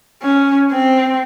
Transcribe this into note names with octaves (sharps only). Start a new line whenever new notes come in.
C#4
C4